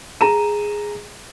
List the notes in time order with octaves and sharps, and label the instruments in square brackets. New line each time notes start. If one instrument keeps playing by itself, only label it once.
[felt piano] G#4 A#5 D#7 E7